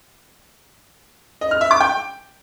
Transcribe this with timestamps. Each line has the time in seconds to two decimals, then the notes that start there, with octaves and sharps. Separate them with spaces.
1.41 D#5
1.51 F6
1.61 E5
1.71 D6
1.81 G5